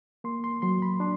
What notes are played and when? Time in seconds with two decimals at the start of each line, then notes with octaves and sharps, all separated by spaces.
0.24 A#3 C6
0.44 C6
0.62 F#3 C6
0.82 B5
1.00 D4 C6